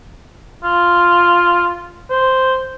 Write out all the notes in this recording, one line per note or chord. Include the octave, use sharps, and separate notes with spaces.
F4
C5